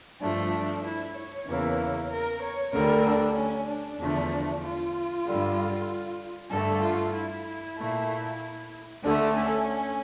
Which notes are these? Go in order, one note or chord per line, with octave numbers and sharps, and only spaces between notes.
G2 F3 A3 D4
E4
C#5
E2 C#3 E3 A#3
A#4
C#5
D2 D3 G3 A#4
D4
C#4
D4
E2 D3 F3 A3
F4
G2 D3 G3
G2 D3 A3 A4
F4
E4
A#2 A3
D2 D3 A3 D4
C#4